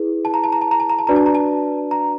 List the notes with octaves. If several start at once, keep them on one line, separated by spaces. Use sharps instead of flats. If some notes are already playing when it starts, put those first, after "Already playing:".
Already playing: E4 G#4 B4
A5
A#5
A5
A#5
A5
A#5
A5
A#5
A5
D4 F#4 B4 D5 A#5
A5
A#5
A5
A#5